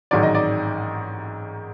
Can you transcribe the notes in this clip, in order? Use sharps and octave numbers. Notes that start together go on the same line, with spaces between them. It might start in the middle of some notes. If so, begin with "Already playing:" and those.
A1 G#2 D#3 F#3 D5
D#5
D5